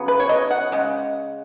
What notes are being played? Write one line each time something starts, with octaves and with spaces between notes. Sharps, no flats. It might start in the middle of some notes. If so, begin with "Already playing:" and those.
Already playing: C#3 F#3 B3
B4
C#5
D#5
F#5
C#3 G#3